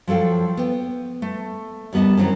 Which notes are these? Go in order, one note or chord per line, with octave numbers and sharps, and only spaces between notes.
F3 F#3 A4 F5 G5
B3 G5
A3
D#2 G3 B3 D#5 A5
D#3 E3 F#3 C4 C#4